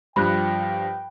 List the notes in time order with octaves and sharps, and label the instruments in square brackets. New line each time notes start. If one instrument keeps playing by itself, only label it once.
[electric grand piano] G2 F3 G3 [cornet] G5 [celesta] B5 F#6